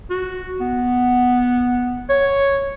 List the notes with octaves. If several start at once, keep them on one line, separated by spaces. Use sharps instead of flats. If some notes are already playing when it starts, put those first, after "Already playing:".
F#4
B3
C#5